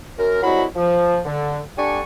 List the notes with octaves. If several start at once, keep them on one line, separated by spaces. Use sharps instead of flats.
F#2 A#4
C2 F#3 G#3 E4 F#4 B5
F3
D3
D3 G3 D4 G#5 C#6